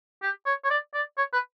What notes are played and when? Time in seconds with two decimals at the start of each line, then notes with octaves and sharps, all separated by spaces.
0.23 G4
0.46 C#5
0.64 C#5
0.70 D5
0.94 D5
1.18 C#5
1.33 B4